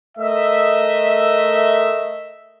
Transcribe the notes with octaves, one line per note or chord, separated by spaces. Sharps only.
A3 A#4 D#5 E5